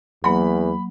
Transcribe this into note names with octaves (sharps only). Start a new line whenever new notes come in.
E2 F#3 A#3 B5